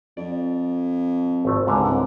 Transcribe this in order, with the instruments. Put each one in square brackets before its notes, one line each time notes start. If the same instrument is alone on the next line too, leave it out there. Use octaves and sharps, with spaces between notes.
[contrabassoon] F2 [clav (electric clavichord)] D5
[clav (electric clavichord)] G#1 A3 C4
[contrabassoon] G#1 [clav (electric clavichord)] C#2 G#2 D3
[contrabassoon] C2